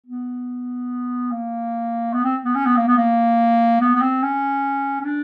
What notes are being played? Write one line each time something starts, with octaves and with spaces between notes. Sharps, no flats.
B3
A#3
B3
C4
B3
C#4
B3
A#3
B3
A#3
B3
B3
C4
C#4
C#4
D4